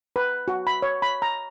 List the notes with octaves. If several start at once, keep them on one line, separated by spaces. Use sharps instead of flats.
B4
F#4
B5
C#5
B5
A#5